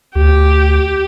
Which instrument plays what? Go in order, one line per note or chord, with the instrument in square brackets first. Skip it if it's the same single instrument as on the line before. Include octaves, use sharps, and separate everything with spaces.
[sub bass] D2 [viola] G4